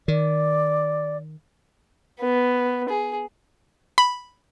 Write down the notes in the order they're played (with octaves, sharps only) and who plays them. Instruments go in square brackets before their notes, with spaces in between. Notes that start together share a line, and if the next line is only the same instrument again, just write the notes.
[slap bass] D#3 [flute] D5
[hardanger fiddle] B3
G#4
[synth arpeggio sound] B5